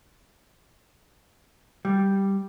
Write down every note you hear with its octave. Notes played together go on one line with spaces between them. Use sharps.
G3